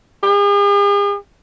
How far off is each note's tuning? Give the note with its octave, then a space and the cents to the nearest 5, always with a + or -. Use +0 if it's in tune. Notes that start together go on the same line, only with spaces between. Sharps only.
G#4 -45